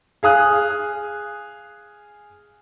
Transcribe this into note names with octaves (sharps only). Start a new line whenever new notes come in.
G#4 F5 D#6 F#6